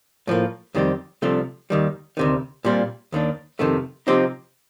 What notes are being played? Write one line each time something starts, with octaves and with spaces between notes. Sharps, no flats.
A2 F3 A#3
F2 D#3 G3 C4 G4
C2 C3 F3 A3 D4
D#2 D#3 G3
D2 C3 D#3
A#2 G3 C4 F4
D#2 D#3 A#3 D4
F2 C3 D#3 A3
C3 F3 C4 D#4 G4